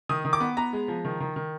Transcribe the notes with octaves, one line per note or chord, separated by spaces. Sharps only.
D#3 D#6
D#3
D6
B3
B3 A#5
G#3
F3
D#3
D#3
D#3